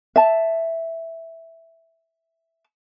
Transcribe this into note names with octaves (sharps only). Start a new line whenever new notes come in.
E5 A5